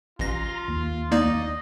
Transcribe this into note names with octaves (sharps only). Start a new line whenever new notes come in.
A1 F4 A#5 C6 A#6
D#2
A#3 D#4 D5 D#5